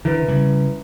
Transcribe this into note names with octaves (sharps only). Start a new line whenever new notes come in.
D3 D#3 E4 B4
C#3 G3